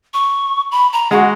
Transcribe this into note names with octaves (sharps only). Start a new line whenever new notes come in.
C#6
B5
A#5
G#3 F#4 F#5